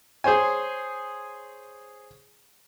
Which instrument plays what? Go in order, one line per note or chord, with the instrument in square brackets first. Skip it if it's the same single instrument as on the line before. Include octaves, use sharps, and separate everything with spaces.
[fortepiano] G#4 C5 C#5 G#5